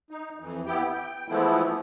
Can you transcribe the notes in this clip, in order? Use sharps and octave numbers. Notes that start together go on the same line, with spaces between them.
D#4
F2 E3
B3 E4 G4 G5
G5
E3 F3 G#3 A3 B3 E4